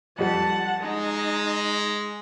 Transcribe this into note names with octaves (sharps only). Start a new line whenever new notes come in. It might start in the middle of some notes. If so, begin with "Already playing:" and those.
F2 G3 F#5 A5
G#3 D#4